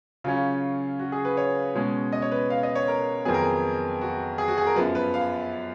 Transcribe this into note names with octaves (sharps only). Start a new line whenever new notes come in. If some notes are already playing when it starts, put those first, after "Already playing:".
C#3 F#3 C#4 F4
F#4
G#4
B4
C#5
B2 G#3 C#4
D#5
C#5
B4
F5
D#5
C#5
A#4
F2 D#3 F#3 B3 G#4
A#4
G#4
F#4
G#4
F#4
G#4
A#4
F#2 F3 B3 B4
B4
F5